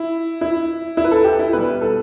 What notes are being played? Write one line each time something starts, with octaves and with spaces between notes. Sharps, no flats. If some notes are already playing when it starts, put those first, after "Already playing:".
Already playing: E4
E4
E4
B4
A4
G4
E4
B2 G3 B4
A4